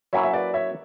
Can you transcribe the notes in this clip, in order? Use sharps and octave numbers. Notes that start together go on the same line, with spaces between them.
F#3 A#3 C#4 E4 C#5 E5
E5
B4 D5
C#5 E5